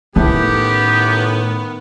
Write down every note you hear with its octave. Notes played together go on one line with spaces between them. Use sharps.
A2 D#3 B3 C#4 G4